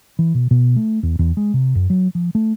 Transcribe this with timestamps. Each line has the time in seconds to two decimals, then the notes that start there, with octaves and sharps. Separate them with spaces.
0.19 E3
0.35 B2
0.51 B2
0.77 A3
1.03 E2
1.19 E2
1.37 G#3
1.54 C3
1.75 F#2
1.90 F#3
2.15 F3
2.35 A3